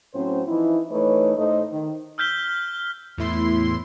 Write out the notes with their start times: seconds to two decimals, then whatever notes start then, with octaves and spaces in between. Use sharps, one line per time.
0.14 A2 F#3 C4 C#4 C5
0.48 E3 F3 D#4 E4
0.91 E3 A3 D#4 B4 C#5
1.38 A2 A3 D#4 A4 C5 D#5
1.72 D#3
2.18 E6 F6 G6 B6 G7
3.18 E2 A2 E4 C6